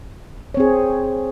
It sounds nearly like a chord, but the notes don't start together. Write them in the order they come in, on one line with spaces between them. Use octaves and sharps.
C#5 C4 G#4